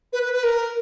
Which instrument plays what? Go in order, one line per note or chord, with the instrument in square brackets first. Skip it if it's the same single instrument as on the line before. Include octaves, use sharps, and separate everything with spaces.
[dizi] B4
B4
B4
A#4